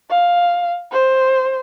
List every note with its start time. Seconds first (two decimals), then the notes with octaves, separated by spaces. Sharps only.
0.10 F5
0.91 C5